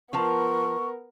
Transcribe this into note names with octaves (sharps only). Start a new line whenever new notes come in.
F3 B3 F4 A#4 A5 C#6